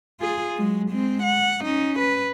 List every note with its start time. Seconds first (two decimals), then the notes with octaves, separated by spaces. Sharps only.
0.20 F4 G#4
0.57 F#3 G#3
0.91 G#3 C4
1.23 F#5
1.65 C#4 D#4
1.99 B4